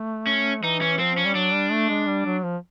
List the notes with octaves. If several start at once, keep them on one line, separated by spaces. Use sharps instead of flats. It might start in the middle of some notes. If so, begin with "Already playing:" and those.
Already playing: A3
C#4
E3 D#4
C#4
F3 C4
C#4
G3
F#3 D4
G3
A3
G#3
G3
F#3
F3